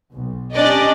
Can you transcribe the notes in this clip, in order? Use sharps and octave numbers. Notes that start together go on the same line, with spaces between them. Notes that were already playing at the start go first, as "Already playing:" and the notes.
B1
C#4 D4 G4 D5 D#5